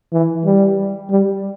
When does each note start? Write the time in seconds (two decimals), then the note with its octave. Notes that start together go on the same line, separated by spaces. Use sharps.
0.13 E3
0.46 G3
1.11 G3